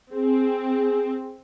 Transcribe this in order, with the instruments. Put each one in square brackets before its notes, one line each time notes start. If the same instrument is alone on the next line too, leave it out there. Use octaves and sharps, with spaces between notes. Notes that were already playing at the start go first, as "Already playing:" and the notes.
[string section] C4 [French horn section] G#4